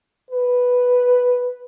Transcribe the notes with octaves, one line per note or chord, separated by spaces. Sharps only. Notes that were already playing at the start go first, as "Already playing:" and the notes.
B4